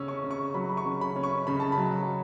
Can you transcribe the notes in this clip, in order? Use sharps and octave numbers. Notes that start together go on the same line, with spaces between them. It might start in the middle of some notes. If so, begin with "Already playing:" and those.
Already playing: C#3 C#4 E6
C#6
C#3
C#6
F#3 B5
B5
C#6
C#3
B5
C#4
C#6
C#3 B5
A5
B5
F#3